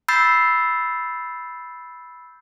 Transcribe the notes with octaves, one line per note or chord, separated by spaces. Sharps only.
B5 E6 G6 A6 C7